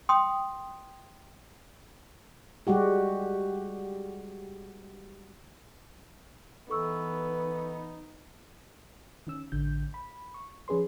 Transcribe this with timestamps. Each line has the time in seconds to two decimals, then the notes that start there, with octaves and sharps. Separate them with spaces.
0.09 G5 C6 D#6
2.67 G3 G#3 F#4 G4
6.70 E3 B3 D#4 A4 C#6 E6
9.27 D#3 C#4 E6
9.52 A1 D3 G6
9.94 B5
10.34 C#6
10.68 F3 C#4 G#4 B4 C6